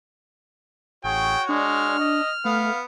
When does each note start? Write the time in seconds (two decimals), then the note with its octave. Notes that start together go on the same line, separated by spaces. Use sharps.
1.04 A1 F#4 G#4 C#5 G5
1.49 G#3 D4 F6
1.99 D#5
2.45 A3 B3 F5